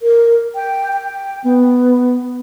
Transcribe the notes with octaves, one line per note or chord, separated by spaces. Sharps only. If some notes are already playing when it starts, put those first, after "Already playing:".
A#4
G5
G5
B3